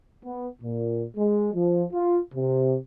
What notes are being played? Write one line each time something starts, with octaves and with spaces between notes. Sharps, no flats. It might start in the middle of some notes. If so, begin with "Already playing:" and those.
B3
A#2
G#3
F3
F4
C3